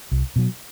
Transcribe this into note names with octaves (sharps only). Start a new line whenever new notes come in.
C2
B2 F#3